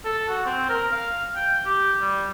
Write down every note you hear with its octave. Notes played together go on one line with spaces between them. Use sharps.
A4
F#4
C4
A#4
F5
G5
G4
G3